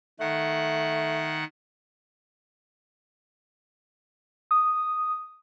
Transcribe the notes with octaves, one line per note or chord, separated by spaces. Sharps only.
D#3 A3 F#5
D#6